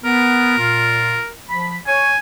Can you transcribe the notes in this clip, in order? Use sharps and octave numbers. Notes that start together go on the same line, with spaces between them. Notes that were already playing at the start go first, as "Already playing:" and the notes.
B3 A#4
A#2 F4
F3 B5
C#5 G#5